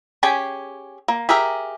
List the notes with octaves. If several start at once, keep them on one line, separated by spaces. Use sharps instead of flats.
C#4 G4 G#4 G5 G#5
A#3
G4 G#4 A#4 E5